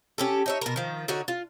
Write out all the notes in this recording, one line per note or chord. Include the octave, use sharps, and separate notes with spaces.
C#4 G4 A4
D#4 C#5 E5
B2 A#4
D#3 F3
D3 D#4 F#4 C#5
F4